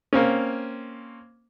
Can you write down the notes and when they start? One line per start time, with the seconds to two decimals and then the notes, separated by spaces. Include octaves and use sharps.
0.13 A#3 C4 C#4